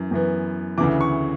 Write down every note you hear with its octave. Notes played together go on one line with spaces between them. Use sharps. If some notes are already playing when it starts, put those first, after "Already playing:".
Already playing: F#2 E3
F#2 E3 B3
D2 C#3 E3 D6
C#6